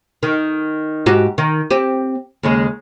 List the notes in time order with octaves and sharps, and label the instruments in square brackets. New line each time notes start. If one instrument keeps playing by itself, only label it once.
[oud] D#3
G#2 F#4 G4
D#3
C4 G4
D#2 C#3 G#3